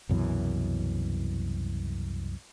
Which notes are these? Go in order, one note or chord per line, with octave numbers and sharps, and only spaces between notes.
C2 F#2 B2 E3